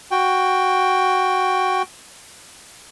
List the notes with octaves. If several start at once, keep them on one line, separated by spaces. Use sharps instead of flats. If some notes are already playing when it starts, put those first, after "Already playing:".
F#4 G5